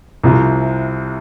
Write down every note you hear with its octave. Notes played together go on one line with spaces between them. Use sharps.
C2 C3 F3